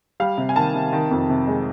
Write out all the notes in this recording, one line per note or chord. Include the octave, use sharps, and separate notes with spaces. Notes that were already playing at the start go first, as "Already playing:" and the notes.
G3 F5
C3
G#5
D#3 A5
C3
D#3
F2
C3
G#3